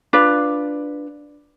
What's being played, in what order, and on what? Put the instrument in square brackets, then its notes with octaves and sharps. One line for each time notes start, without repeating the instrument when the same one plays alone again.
[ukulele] D4 F4 B4